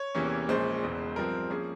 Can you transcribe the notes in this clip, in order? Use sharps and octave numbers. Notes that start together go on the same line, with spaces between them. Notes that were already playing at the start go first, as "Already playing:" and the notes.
Already playing: C#5
E2 C3 E3 A#3 C#4
A#1 A#2 G#3 C#4 C5
E1 E2 C#3
G2 F3 C4 A#4
F3 A#3 C#4 G#4